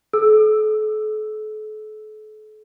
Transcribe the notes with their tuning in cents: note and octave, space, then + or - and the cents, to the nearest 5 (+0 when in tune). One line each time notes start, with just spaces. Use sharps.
A4 -40 E6 +0